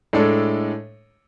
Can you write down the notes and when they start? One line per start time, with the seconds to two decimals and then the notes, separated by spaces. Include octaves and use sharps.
0.13 A2 G#3 D4 A4